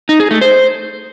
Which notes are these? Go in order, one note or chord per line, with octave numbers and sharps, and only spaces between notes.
D#4
G#4
A3
C5